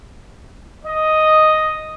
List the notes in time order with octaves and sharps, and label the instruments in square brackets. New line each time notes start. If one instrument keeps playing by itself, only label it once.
[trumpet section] D#5